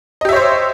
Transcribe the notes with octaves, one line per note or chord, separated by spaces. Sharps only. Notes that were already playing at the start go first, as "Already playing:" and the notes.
G4 C5 C#5 D#5 E5